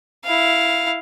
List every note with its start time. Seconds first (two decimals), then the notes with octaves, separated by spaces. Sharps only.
0.25 E4 F5